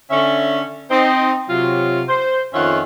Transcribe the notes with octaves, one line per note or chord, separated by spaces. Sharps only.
D3 C#4 E5
C4 D#4 C5
C3 F#3 F4
C5
F2 D#3 C#4 F4 E5 F#5